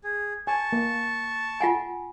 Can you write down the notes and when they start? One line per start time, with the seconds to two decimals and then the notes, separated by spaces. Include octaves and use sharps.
0.04 G#4
0.47 G#5 A5 C#6
0.73 A#3
1.60 F4 F#5 G#5